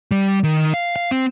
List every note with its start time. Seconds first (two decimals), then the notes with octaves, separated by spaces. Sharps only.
0.11 G3
0.44 D#3
0.74 F5
0.96 F5
1.11 C4